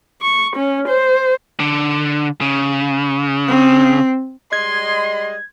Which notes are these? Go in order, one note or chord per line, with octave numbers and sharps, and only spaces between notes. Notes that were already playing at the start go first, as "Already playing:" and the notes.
C#6
C#4
C5
D3
C#3
C4
G3 G#3 D#5 C6 G#6